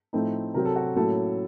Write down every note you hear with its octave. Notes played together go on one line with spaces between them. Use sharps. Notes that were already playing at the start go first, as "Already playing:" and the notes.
A2 F3 A3 C4 D#4
C3 F#3 C4 A#4
A4
F#4
A2 F#3 A#3 C#4 A4